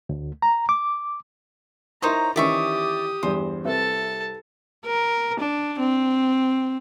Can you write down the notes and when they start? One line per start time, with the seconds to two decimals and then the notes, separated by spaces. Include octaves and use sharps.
0.09 D2
0.42 A#5
0.69 D6
2.02 D#4 E4 A#4 C5 C#5 A#5 C6
2.36 D#3 E3 C#4 G4 D5 E5 C#6 D#6
3.23 E2 G2 C5
3.65 C2 A4 B4 E5 A5
4.86 A#4
5.40 D4
5.79 C4